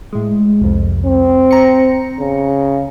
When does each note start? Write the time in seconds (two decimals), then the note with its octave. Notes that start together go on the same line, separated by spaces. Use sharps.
0.13 A2 G#3
0.61 C2 F2
1.06 C4
1.51 A#5 C#7
2.20 C#3